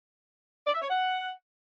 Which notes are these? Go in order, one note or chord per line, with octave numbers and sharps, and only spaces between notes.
D5
E5
C#5
F#5